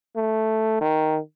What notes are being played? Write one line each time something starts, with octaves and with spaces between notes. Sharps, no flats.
A3
D#3